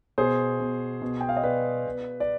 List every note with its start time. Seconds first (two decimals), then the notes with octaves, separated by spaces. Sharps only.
0.18 B2 G#4 C5
0.60 B2
1.02 B2
1.21 G5
1.29 F5
1.36 D#5
1.43 B2 B4 D5
1.86 B2
2.20 D5